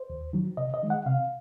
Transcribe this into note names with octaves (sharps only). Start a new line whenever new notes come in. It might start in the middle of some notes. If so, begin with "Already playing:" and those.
Already playing: C5
D#2
D#3 F#3
C3 D#5
D#5
D#3 G#3
F#5
C3 F5